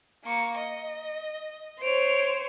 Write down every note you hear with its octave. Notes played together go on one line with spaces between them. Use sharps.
A#3 C#6
D#5
C5 C#5 D7 F7